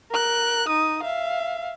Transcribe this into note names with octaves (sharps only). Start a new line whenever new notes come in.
A#4 F#6
D#4 D#6
E5 F5